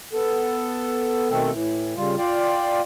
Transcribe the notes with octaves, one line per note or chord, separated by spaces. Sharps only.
B3 A4
B2 D#3 A3 C4 A4
A2 E3
C#3 G3 F4
F4 D5 F5 G5